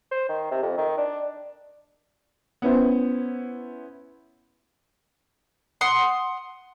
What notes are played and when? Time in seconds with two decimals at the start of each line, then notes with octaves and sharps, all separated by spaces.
0.11 C5
0.29 D#3
0.51 C3
0.62 F2
0.78 D#3
0.98 D4
2.62 B3 C#4 E4 C5
5.81 F#5 C6 D#6